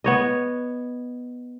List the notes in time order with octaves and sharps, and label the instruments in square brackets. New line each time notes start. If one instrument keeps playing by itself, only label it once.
[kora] B3 C#5 D#5